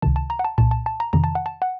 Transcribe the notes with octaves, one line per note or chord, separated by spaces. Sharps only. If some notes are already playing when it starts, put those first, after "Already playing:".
C#2 C3 D#3 A5
A5
A#5
F#5
A5
C2 A#2 A5
A5
A5
A#5
F2 C3 D#3 A#5
A5
F#5
A5
F#5